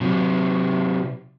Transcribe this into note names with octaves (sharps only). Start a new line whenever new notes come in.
C3 F#3